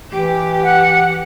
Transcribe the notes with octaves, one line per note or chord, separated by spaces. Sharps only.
E3 G4
F#5